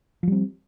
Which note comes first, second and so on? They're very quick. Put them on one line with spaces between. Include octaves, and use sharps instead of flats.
F3 G3 C4